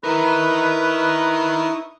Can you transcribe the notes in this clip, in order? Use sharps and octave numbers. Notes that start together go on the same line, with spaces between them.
D#4 E4 A#4 B4 C#6 D#6